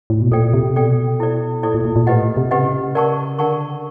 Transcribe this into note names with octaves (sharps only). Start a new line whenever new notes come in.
A2
B2
A#2 A4 D5 G5
C3
B2 A4 D5 G5
E4 A4 D5
A#2 E4 A4 D5
A#2
A#2
A#2
A2 G4 B4 D#5 F#5
C3
C#3 G4 B4 D#5 F#5
A#4 D5 F#5 A5 C#6
D3 A#4 D5 F#5 A5 C#6